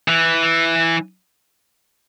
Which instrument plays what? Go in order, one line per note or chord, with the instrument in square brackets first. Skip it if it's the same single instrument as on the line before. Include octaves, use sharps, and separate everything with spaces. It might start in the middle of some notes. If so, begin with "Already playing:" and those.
[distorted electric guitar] E3